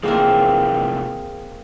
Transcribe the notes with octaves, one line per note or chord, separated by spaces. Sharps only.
C3 E3 F3 A#3 C4 G#4 A#4